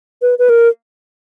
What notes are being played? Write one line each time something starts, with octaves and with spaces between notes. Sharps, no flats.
B4
B4
A#4